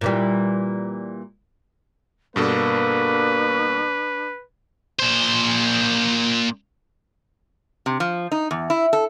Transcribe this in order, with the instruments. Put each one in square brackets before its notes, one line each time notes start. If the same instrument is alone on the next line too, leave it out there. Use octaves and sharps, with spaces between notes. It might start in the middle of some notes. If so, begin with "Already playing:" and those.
[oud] A#2 E3 G3
[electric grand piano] G2 B2 A4 [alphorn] A#3 [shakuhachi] D4 [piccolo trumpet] B4
[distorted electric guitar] A#2 C5
[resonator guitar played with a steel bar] C3
F3
D#4
E2
E4
A4